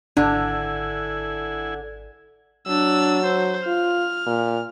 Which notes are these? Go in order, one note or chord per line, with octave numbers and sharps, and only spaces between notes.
G#1 D3 D4 E4 G#5
F#3 D4 E6
C5
F4 F6
A#2